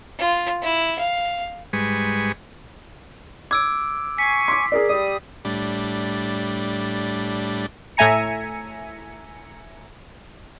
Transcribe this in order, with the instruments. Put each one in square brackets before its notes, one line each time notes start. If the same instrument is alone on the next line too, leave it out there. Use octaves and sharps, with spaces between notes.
[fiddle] F4
E4
F5
[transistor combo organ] G#2 G3 G#3 B4 G#5 C#6
[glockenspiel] D6 E6 D7 [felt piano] G#6
[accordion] G#5 C#6 [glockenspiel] B6 C7
[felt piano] C6 D6 [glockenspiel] B6
[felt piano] G#4 A#4 D5
[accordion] G3 D#6 [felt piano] D5
[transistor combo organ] A2 G3 D4
[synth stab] A2 A3 E5 G#5 A#5 C#7